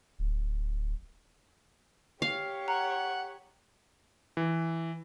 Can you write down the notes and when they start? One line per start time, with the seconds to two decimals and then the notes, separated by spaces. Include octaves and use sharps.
0.19 D1
2.22 G4 C#5 F5
2.68 F#5 A#5
4.37 E3